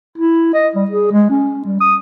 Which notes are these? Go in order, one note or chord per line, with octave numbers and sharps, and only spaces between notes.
E4
D#5
G3
G#4
G#3
C#4
G3
D#6